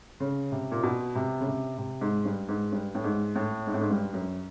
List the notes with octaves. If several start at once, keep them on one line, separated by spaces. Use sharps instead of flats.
C#3
C3
A#2
B2
C3
C#3
C3
C3
G#2
G2
G#2
G2
A2
G#2
A2
G#2
A2
G#2
G2
F#2